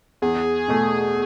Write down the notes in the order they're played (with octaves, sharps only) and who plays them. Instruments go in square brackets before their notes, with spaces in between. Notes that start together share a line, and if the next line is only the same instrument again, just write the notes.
[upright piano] E2 [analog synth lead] G#4
[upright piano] B2 A3